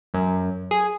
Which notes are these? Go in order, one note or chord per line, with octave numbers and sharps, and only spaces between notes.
F#2
G#4